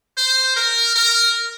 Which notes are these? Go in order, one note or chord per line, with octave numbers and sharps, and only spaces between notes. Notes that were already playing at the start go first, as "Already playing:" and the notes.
C5
A#4
A#4